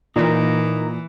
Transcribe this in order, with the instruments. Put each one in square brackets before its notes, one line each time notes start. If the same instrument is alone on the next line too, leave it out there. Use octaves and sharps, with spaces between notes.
[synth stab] A#2 [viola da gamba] E3 [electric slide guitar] D#4 A#4